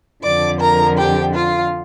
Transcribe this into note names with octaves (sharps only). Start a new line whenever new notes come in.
F2 D3 F3 D5 D6
A#4 A#5
G4 G5
F4 F5